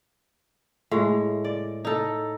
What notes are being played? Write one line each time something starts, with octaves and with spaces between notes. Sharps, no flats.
A2 G#3
D5
D#4 A4